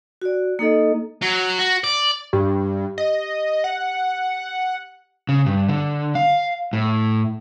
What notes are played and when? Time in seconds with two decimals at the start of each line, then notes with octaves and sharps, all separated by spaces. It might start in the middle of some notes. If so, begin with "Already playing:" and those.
0.22 F#4 D5
0.59 A#3 D#4 A4 D#5
1.22 F#3
1.59 F#4
1.84 D5
2.33 G2 G4
2.98 D#5
3.64 F#5
5.29 C#3
5.46 G2
5.69 D3
6.15 F5
6.73 A2